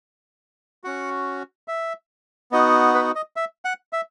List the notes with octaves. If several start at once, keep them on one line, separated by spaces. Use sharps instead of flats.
C#4 F#4 F#5
E5
B3 D#4 F#4 D#5
B4
D#5
E5
F#5
E5